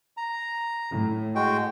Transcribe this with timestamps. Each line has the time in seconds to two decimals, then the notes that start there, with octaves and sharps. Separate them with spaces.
0.17 A#5
0.91 A2
1.35 G#3 F#4 G5